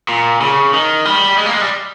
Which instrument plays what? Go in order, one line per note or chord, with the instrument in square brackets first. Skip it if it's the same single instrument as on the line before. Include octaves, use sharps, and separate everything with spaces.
[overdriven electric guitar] A#2
C#3
D#3
G3
G#3
A#3
G#3
G3